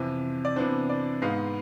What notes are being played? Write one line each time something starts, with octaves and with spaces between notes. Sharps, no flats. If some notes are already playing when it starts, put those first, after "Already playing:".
Already playing: F2 C3 E3
D5
C3 E3 B3 D4 C5
D5
G#2 G#3 B3 F5